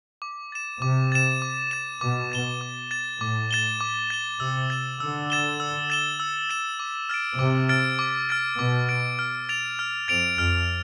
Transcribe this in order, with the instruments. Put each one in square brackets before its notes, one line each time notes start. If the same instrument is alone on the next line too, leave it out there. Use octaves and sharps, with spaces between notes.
[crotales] D6
A6 E7
[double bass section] C3 [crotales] D6
[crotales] A6 E7
D6
A6 E7
[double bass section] B2 [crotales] D6
[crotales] A6 E7 G7
D6
A6 E7 G7
[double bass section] A2 [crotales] D6
[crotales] A6 E7 G7
D6
A6 E7 G7
[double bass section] C3 [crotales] E6
[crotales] A6 E7 G7
[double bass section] D3 [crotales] E6
[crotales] A6 E7 G7
E6
A6 E7 G7
E6
A6 E7 G7
D6
F6 A6 D7
[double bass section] C3 [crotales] D6
[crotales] F6 A6 D7
D6
F6 A6 D7
[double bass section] B2 [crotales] D6
[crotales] F6 A6 D7
F6
A6 D7 F7
F6
[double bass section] F2 [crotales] A6 D7 F7
[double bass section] F2 [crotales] F6